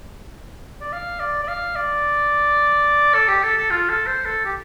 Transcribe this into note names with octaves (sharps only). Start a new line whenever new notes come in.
D5
F5
D5
D5
F5
D5
A4
G4
A4
A4
F4
A4
C5
A4
G4